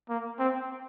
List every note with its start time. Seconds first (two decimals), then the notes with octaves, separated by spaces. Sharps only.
0.09 A#3
0.39 C4